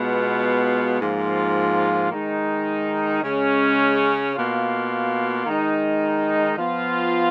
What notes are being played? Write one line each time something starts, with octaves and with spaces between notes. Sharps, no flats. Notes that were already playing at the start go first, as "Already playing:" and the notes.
Already playing: B2 G#3 B3 F4
G#2 F3 A#3 F4
D#3 G#3 D#4
C#3 G#3 C#4
B2 A#3 F4
D#3 G#3 D#4
F3 B3 F4